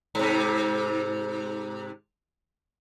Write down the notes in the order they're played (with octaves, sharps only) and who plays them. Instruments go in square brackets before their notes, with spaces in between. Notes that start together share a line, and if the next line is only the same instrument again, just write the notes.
[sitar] G#2 C3